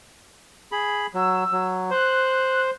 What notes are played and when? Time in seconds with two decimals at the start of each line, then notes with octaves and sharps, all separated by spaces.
0.72 G#4 B5
1.14 F#3 E6
1.52 F#3
1.90 C5 F#6